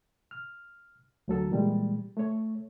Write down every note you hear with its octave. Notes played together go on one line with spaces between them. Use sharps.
F6
D2 F#3 A4
A#2 E3 G3 G#3
A3 C#5